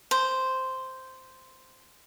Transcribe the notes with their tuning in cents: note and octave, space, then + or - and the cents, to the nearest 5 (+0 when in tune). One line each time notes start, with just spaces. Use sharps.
C5 -5